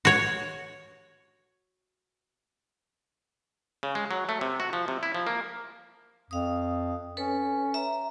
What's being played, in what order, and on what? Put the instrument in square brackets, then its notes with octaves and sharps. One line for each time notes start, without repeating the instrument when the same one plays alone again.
[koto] F#4 C#5
[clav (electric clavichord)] C#3
G#3
F#3
A3
C3
F#4
F3
C3
E4
F3
A#3
[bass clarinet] F2 [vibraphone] F5 D#6
[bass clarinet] C#4 [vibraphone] A4 B4 C#5
[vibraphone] E5 A#5